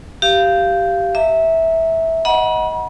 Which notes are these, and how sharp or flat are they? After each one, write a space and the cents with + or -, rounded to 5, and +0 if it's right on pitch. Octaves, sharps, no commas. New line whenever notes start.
G4 -10 F5 -15
E5 -15 A#5 -35
D#5 +20 F#5 +0 B5 -45